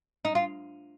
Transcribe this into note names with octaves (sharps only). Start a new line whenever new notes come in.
D#4
F4